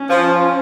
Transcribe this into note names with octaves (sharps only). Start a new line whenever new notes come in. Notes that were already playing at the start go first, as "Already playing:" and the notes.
Already playing: C#4
F3